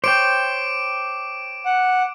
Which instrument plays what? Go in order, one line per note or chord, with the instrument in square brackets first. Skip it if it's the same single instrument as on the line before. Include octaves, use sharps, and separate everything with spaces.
[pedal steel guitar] C5 C#5 G5 [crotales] D6 D7
[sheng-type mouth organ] F#5